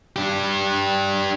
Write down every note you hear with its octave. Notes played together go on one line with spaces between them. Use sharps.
D4 G4